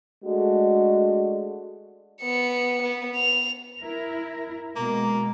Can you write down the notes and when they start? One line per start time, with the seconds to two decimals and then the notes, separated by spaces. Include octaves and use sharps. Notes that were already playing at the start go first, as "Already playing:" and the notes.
0.25 G#3 A3 D4 F#4
2.22 B3 C#7
2.82 B3
3.16 F7
3.81 E4 A#4
4.75 B2 G#3 A#3